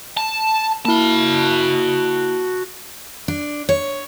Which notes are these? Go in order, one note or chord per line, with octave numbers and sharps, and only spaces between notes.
A5
A#3 E4 F#4 A5
D4
C#5